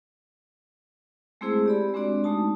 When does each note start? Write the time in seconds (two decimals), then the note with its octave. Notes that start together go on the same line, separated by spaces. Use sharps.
1.41 G#3 A3 C4 E4 G#4 C5
1.66 G4 D5 B5
1.94 G#3 C4 D4 F#4 D5
2.24 G#3 A3 D#4 A5